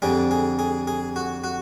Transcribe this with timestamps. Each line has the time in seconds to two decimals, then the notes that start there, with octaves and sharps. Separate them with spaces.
0.02 F2 D3 G3 G#4
0.31 G#4
0.59 G#4
0.87 G#4
1.16 F#4
1.44 F#4